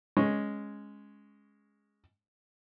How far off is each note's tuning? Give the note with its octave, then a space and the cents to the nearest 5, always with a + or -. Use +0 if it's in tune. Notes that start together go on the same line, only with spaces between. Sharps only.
G#3 +0 C#4 +0 C#6 -10